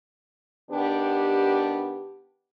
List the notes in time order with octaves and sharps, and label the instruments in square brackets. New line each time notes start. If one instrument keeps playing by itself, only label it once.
[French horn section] D#3 B3 D4 G4